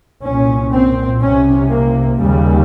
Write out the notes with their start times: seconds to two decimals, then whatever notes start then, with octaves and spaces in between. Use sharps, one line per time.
0.25 C2 A#2 C#4
0.73 C4
1.22 C2 C3 C#4
1.70 A#3
2.19 D#2 C#3 G3